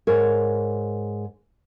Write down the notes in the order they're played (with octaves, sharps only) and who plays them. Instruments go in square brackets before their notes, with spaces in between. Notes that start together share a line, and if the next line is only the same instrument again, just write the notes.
[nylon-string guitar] G#2 A#4 C#5